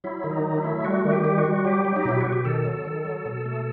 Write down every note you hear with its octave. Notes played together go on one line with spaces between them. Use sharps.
F#3 E4
D#3
D#4
F#3
E4
A3
G3 F#4
D#3
G4
G3
F#4
G3
F#3 G4
F#3
D#4
B2 E4
B2 F#4
G4
D#3 A4
F#3
D#3
F#3
B2
A3